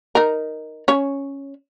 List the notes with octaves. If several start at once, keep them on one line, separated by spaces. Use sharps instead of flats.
D#4 A#4
C#4 C#5